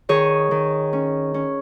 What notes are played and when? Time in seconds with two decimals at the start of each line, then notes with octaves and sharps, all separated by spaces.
0.09 D#3 G#4 C#5
0.51 D#3
0.93 C#4
1.34 C#4